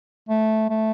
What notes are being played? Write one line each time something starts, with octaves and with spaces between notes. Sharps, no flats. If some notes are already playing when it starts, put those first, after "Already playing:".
A3
A3